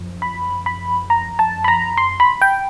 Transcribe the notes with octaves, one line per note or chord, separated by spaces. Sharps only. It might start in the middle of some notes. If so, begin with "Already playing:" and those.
Already playing: F#2 F3
B5
B5
A#5
A5
B5
A#5
C6
B5
G5